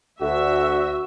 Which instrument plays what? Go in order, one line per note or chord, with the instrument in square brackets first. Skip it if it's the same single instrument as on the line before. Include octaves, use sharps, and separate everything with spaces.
[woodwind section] D2 [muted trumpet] F#4 [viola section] E5